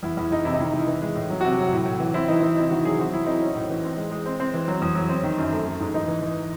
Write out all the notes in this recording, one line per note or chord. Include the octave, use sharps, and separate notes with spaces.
E2 E4
E2 E4
E2 D#4
C3 E4
D#4
D#3 E4
D#3
E3
G#3
A2
F#3
C3 F#4
F#3
A2
A2
E3
C4 E4
E3 D#4
E3 D#4
C3 E4
D#3 F#4
F#3 G#4
C4 F#4
F#3 E4
C4 D#4
C#4
A2
E3
C4
G#3
G#3
C4
C4
E3
F#3
E2
F#3
C4
D#3
F#2
A3
A3
G#2
E3 D#4
E3
E3